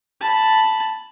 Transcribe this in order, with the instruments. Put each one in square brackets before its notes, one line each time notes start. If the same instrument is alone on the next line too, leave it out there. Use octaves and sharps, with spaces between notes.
[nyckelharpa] A5 B5